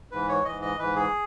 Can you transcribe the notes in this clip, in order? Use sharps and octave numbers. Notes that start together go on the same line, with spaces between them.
G#2 E3 B4
C#5
G#2 E3 D#5
D#5
G#2 E3 B4
G#4